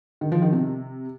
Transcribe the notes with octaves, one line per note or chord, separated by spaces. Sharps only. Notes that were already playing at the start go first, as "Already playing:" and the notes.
D#3
F3
D#3
C3